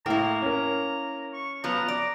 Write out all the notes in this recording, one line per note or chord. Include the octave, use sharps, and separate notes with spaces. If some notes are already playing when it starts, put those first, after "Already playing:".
A2 A#3 E4 A#5
C#4 A#4
C#6
F3 F#3 B3 A#5
D5